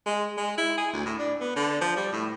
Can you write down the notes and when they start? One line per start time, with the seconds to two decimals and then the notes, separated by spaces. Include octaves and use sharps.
0.06 G#3
0.38 G#3
0.58 E4
0.78 G#4
0.93 D2
1.06 A2
1.19 D4
1.40 B3
1.56 D3
1.81 F3
1.97 G3
2.13 A2